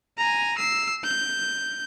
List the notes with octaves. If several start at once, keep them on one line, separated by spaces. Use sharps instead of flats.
G#5 A#5
E6 C7
G6